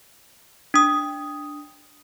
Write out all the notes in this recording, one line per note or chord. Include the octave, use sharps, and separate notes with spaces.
D4 D#6